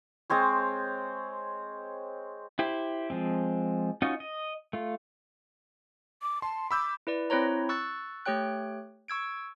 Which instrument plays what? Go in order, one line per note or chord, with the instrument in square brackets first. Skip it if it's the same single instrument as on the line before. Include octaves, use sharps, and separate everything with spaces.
[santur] G#3 C4 C5 C#5
[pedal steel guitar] E4 G4 C5
F3 G#3 C4
C#4 D#4 F4 F#4
D#5
A3 F4
[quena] D6
[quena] A5 [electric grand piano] C6
[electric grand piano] B5 E6 G6 [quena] D6
[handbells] E4 B4 D5
C4 E4 C5 C#5 A#5
C#6 E6 F#6 A6
A3 G4 C#5 G5 F#6
C#6 E6 G#6 D7